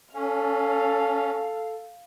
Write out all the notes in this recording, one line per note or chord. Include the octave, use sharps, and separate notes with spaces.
C#4 A4 F5